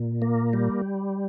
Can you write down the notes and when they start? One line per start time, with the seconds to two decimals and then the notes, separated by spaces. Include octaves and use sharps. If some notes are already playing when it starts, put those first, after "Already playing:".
Already playing: A#2
0.22 A#3
0.53 G3